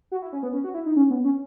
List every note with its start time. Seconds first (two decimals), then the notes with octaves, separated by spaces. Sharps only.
0.12 F#4
0.22 E4
0.33 C#4
0.43 B3
0.53 C#4
0.64 F#4
0.74 E4
0.86 D#4
0.96 C#4
1.10 B3
1.24 C#4